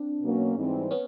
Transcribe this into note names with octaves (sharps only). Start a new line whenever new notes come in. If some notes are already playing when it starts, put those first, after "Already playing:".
Already playing: C4 D4
B2 F#3 A#3 C#4
G#2 E3 G3 C4
B3 C#4